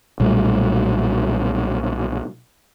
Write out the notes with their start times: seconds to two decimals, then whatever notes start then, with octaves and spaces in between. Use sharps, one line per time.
0.20 B1 A#2 G3 A3